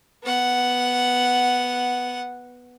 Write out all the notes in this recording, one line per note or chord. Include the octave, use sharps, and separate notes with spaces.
B3 F#5